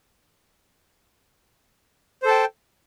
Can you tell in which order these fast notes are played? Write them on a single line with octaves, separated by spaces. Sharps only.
C5 A4 A5 G5